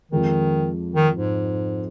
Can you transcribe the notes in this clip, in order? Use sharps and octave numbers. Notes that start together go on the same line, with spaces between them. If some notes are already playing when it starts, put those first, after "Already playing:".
F2 D#3 F3 G#3
D#3
G#2